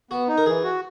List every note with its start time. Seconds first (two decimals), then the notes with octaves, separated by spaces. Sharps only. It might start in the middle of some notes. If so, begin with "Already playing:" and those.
0.11 B3 F#4
0.28 D#4
0.38 A#4
0.46 E3 G#4
0.64 F#4